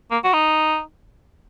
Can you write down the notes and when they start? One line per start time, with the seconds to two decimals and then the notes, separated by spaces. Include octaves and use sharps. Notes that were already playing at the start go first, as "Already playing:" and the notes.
0.11 A#3
0.24 F#4
0.34 D#4